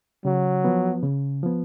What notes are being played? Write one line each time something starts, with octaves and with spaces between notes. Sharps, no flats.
C#3 F#3
F3 B3
C#3
F3 B3